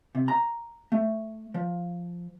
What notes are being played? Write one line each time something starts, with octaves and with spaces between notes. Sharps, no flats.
C3
A#5
A3
F3